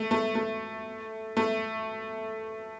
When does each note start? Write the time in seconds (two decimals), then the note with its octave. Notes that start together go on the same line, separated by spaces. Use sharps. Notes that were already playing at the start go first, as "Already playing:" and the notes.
Already playing: A3
0.11 A3
0.35 A3
1.37 A3